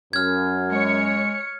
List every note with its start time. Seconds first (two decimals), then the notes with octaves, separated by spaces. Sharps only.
0.13 F#2 F6 G#6
0.71 G#3 C#5 C#7